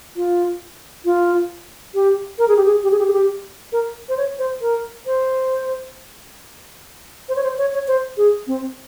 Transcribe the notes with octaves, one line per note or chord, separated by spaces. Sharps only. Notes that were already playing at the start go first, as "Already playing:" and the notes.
F4
F4
G4
A#4
G#4
G4
G#4
G4
G#4
G4
G#4
G4
A#4
C5
C#5
C5
A#4
C5
C5
C#5
C5
C#5
C#5
C5
G#4
C4